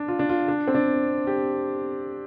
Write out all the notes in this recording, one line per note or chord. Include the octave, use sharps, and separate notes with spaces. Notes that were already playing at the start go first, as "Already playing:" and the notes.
Already playing: D4
F4
D4
F4
D4
C4
D4
G4